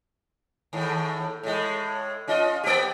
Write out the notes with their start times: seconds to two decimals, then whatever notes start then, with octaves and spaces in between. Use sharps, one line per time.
0.73 D#2 A2
1.43 A2 G#3
2.28 C#4 F4 D#5
2.64 A#3 G4